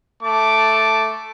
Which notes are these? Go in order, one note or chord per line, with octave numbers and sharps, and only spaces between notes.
A3 A5 D6